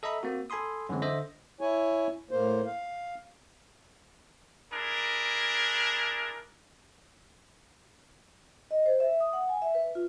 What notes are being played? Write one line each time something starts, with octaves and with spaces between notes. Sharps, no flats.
A4 D#5 E5 A#5 B5
A#3 C4 F#4
A4 G#5 B5 C6 D#6
F#2 D3 E3 G#3 C4
D3 C5 D#5 E5 A#6
E4 C#5 G#5
A2 A#3 C5
F5
D4 E4 G#4 A#4
D#5
C5
E5
D#6
F#5
G#5
E5
B4
F4